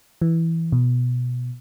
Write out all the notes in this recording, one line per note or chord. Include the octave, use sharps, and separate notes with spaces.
E3
B2